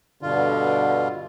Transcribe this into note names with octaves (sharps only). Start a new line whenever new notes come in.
G2 B2 D3 F4